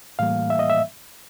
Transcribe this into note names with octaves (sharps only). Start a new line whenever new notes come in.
A2 E3 G3 A#3 F5
E5
D#5
E5